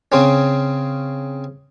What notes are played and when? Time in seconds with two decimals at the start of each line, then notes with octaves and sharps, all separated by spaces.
0.12 C#3 C4 C#4